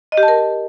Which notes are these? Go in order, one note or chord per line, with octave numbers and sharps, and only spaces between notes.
D#5
G4
A5
A#4